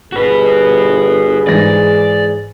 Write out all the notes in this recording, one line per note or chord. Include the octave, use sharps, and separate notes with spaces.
G1 F#4 G#4 B4
G#2 E3 D5 A#6